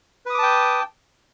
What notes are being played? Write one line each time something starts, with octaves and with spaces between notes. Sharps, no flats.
B4 G5 A5 D6 D#6